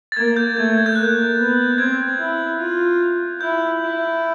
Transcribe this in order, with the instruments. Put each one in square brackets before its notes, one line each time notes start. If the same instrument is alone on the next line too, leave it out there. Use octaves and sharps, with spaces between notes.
[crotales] A6
[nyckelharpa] A#3 [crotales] G#6
[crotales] G6
[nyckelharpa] A3 [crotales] G#6
[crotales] G#6
G6
[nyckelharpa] A#3 [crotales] F#6
[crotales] G6
[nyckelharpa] B3
[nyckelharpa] C4 [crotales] G#6
[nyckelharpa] E4
F4
[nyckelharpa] E4 [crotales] G6
[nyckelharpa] E4